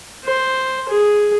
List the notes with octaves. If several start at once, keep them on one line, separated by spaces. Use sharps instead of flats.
C5
G#4